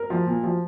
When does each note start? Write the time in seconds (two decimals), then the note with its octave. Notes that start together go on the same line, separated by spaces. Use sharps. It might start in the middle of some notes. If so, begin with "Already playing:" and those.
Already playing: A#4
0.10 F3
0.27 A#2
0.43 F3